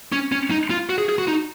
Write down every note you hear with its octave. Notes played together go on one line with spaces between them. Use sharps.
C#4
C#4
D#4
F4
F#4
G#4
G#4
F#4
D#4